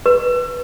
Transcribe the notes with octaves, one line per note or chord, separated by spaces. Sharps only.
B4